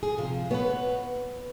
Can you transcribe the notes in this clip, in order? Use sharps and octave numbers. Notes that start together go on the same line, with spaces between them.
G#4
C3 F3
B3 B4 C#5